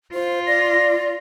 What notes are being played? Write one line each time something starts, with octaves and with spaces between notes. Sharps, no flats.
F4 C5
D5 A#6